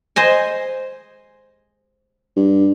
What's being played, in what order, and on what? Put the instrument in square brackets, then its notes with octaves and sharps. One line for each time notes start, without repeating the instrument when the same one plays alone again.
[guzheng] C5 D#5 G#5
[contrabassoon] G2